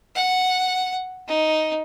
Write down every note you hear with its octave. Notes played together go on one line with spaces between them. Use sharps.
F#5
D#4